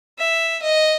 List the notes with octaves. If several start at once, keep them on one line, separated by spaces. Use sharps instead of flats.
E5
D#5